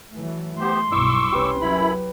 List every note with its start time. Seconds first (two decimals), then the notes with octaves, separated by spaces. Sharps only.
0.14 E3 F#3 A3
0.60 A3 B3 G4 C5 C6
0.92 B1 G2 B2 E4 C#6 D6 E6
1.32 F1 C2 C#4 G4 B4
1.61 F#2 F#3 E4 B5